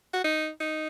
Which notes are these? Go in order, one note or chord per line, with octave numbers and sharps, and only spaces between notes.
F#4
D#4
D#4